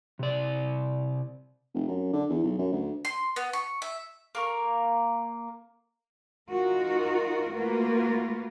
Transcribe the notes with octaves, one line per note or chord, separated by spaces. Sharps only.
C3 D5
F1
F#2
D3
E2
B1
F#2
D2
C6
B3
C#6
E5
A#3 A#4 C#6
D#4 F4 F#4 A#4
A3 A#3 F4 F#4 A#4 B4